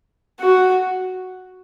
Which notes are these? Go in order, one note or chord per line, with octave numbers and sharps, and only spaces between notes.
F#4